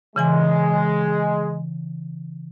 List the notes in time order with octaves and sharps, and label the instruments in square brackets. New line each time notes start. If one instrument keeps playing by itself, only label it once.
[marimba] C#3 E3 G#5 [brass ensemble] G#3